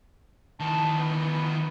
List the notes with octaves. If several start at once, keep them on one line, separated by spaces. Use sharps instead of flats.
D#3 E3 A5
B3